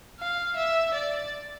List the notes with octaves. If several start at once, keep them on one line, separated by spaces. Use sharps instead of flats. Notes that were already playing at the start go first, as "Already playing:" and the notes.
F5
E5
D5